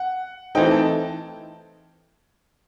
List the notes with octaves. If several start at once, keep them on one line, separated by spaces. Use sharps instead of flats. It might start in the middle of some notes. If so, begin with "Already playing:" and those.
Already playing: F#5
E3 A3 C4 D#4 G5
A5